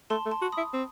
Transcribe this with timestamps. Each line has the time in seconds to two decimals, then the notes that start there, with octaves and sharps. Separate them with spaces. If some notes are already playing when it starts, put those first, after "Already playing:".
0.10 A3 A5 C6
0.26 A3
0.31 A5 C6
0.42 F#4
0.52 E4 B5 D#6
0.73 C4